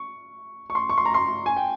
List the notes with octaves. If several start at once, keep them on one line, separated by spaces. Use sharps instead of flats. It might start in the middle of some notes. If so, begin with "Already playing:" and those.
Already playing: C#6
C#6
C6
C#6
C6
A#5
C6
G#5
G5